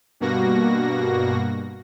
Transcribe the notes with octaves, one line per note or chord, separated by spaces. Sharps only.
G2 B2 A#3 F#4 A#6